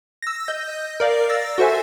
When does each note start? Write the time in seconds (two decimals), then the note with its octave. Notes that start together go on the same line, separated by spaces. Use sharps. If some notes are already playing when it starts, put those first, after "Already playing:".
0.22 E6 A#6
0.48 D#5 G6 A#6
1.00 A#4 D5 F5
1.29 E6 A6 A#6
1.58 F#4 A4 C5 E5 G#5